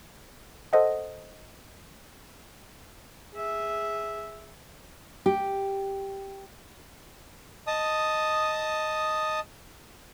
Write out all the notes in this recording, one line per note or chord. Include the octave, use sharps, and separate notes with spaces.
A4 C5 D#5 F#5
G#4 E5
G4
D#5 A5 D#6